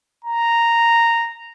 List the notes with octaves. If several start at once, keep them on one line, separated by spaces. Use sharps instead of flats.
A#5